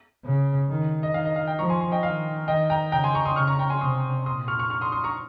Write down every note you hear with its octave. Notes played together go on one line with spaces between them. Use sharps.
C#3
D#3
D#5
D#3 F5
D#5
F5
D#5 G5
F3 A#5 C#6
G#5 C6
G#5 C6
D#5 G5
D#3 F5
D#3 D#5 G5
G5 A#5
C#3 G5 A#5
G#5 C6
A#5 C#6
C6 D#6
C#3 C#6 F6
A#5 C#6
G5 A#5
G#5 C6
C3 C6 D#6
A#2 C6 D#6
C#6 F6
C#6 F6
C#6 F6
C6 D#6
C6 D#6
A#5 C#6